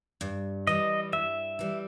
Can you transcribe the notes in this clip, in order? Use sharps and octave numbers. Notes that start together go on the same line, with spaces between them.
G2
E3 G3 D#5
G2 E5
E3 G3